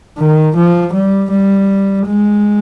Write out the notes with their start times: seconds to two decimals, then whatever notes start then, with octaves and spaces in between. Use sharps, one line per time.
0.18 D#3
0.56 F3
0.93 G3
1.31 G3
2.07 G#3